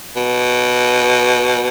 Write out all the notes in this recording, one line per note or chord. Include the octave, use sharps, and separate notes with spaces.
B2